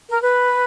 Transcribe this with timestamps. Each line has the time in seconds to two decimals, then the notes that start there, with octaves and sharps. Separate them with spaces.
0.09 A#4
0.21 B4